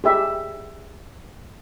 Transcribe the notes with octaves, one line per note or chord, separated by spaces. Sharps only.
G4 G#4 E5